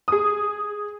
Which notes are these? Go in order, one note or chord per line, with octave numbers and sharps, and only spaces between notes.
G#4 D#6